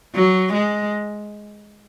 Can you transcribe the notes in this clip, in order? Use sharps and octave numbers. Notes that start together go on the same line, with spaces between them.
F#3
G#3